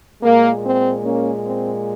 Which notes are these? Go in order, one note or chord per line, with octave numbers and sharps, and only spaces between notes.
A#2 G#3 A#3
C4
A#3 C#4
C4